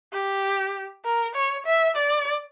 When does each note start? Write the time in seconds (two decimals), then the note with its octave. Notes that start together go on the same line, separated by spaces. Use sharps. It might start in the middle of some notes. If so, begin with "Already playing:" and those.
0.13 G4
1.05 A#4
1.35 C#5
1.66 E5
1.96 D5